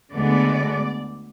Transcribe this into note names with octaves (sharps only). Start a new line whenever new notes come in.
D2 D3 G#3 B3 D5